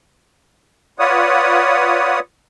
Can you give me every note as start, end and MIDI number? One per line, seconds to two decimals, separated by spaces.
0.99 2.19 65
0.99 2.19 71
0.99 2.19 73
0.99 2.19 74
0.99 2.19 78
0.99 2.19 87